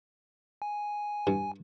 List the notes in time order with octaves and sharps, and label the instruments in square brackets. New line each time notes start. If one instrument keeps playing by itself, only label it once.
[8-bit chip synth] G#5
[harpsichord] G2